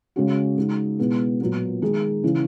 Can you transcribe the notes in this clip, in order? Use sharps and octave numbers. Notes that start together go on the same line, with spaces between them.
C#3 G#3 C#4 F#4
C#3 G#3 D#4 F#4
B2 G#3 B3 E4 G#4
A#2 F#3 B3
D#3 G#3 D#4 G#4
C#3 E3